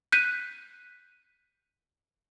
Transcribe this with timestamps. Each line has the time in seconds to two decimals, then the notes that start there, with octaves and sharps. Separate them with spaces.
0.12 F#6 G6 B6 D#7